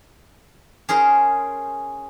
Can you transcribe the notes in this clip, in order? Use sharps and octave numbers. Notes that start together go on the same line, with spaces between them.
C#4 G#4 A#4 C5